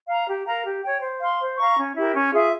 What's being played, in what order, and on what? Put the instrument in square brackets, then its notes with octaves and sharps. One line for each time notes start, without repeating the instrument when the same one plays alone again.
[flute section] F5 A#5
G4
A#4 F5 A#5
G4
C#5 G5
C5
F5 C6
C5
F5 A#5 C#6
C#4
E4 G4 A#4
C#4
F4 G#4 E5